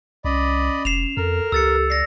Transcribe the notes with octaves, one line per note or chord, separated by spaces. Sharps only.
C2 C#4 D5 D#5 B5
F1 C7 E7 F7
F2 A4 A#4
C#2 G4 A4 E6 A6 C#7
D5 A#6 C7